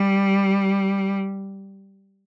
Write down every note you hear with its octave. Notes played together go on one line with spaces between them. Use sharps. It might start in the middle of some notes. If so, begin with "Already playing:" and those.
Already playing: G3